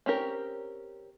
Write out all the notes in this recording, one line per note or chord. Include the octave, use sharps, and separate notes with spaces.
C4 C#4 G4 A#4